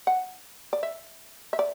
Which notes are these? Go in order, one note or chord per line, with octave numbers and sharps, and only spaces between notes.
F#5
D5
E5
E5
D5